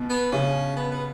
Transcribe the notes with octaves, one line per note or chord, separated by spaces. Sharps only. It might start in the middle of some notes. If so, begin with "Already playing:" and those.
Already playing: B2
B3
C#3 C#4
B3
B3